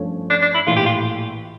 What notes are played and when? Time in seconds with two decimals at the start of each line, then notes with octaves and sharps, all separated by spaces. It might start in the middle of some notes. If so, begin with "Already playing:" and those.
Already playing: G2 F3 A3 C#4
0.30 D4
0.42 D4
0.55 E4
0.67 A#1 A2 E3 F4
0.76 G4
0.86 F4